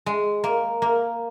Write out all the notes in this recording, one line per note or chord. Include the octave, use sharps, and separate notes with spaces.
G#3
A#3
A#3